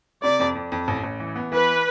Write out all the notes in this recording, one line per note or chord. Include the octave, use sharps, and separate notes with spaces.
C3 D5
F2
F2
F2
A1
A1
E3
B3
E3 B4